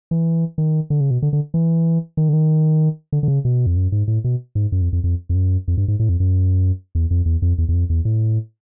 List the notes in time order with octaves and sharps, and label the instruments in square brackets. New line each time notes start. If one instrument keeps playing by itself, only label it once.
[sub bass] E3
D#3
D3
C#3
B2
D3
D3
E3
D#3
D3
D#3
D3
D3
C#3
B2
F2
F#2
G#2
A2
B2
G#2
F#2
F2
F2
F2
F2
F#2
F2
G2
G#2
A2
F2
F#2
E2
F2
E2
F2
E2
E2
F2
E2
A2